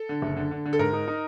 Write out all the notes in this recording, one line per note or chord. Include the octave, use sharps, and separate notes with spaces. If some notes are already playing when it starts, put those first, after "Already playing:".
Already playing: A4
D3
F#1
D3
D3
D3
A4
G#2 A#4
D#4
D#4